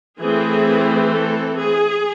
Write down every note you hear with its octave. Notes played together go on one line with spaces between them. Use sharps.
E3 A3 C4 G#4
A4
G#4